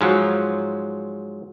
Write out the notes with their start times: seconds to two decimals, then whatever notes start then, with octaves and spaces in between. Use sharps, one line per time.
0.01 G#2 F3 F#3